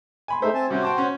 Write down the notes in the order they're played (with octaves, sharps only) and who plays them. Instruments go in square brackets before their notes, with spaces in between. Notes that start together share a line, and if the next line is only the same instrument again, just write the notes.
[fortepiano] G#5 B5 C6
[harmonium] G#3 A3 D#4 [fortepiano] C5 E5
[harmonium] C4 G#5 A5
[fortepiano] C3 G3 C#4 [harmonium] F#4 C5
[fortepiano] G5 A5 D6
C#4